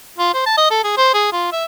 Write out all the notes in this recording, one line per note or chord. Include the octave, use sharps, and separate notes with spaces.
F4
C5
A5
D#5
A4
G#4
C5
G#4
F4
E5